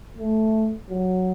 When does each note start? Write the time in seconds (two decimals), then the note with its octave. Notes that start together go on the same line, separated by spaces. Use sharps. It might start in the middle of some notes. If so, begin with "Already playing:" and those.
0.18 A3
0.90 F#3